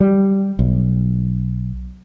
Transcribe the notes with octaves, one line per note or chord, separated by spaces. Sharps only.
G3
B1